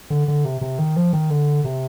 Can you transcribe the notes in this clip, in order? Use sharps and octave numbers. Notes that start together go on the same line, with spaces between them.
D3
D3
C3
C3
D#3
F3
D#3
D3
C3